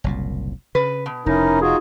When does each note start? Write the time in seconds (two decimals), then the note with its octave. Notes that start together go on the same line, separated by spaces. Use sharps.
0.04 F#1 C2 A#2
0.75 C#3 B4
1.06 B2
1.26 F1 C#4 D#4 E4 A#4
1.61 D#4 F4 F#4 G#4